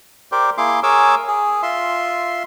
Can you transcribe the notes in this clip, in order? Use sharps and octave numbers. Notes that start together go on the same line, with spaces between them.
G4 A#4 C5 D5
A#3 E4 G#4 C6 D6
G#4 A#4 C#5 G#5 D6 E6
G#4
F4 E5 C6